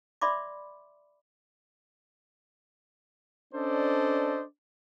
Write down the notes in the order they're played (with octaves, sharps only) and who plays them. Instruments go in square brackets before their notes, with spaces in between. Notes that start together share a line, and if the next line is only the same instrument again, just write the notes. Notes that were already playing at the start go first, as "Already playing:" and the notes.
[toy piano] D5 E5 B5 C6 D6
[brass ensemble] C#4 D4 A4 C5 D5 D#5